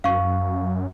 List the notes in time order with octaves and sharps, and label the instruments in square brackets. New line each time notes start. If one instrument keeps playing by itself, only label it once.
[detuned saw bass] F#2 [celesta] F5 C#6